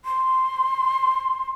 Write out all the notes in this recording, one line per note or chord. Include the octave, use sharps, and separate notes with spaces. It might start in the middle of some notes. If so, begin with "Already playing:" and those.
C6